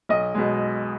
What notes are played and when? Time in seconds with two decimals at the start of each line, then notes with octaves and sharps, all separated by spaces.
0.09 B1 D#5
0.35 B2 G#3